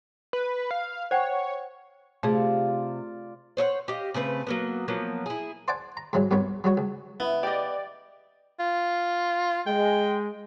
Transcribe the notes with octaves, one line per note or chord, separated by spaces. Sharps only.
B4
F5
C5 C#5 F#5 G5
C3 A3 F4 G#4 D5
C5 C#5 E5 F#5
G4 D#5 F5
C#3 A3 C4 B4
F#3 A#3 B3
F3 F#3 A#3 B3
E4 G#4
C5 D5 F#5 G#5 A5 D6
A#5
G#2 E3 F#3 G3
B1 G2 A#2 B3 C#5
F#3 G3 F#4 C#5
C#2
C#3 B3 E4 E5
G4 D5 D#5
F4
G#3 G5